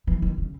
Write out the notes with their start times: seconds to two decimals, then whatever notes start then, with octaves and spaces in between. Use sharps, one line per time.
0.07 E3
0.22 D#3
0.38 C#3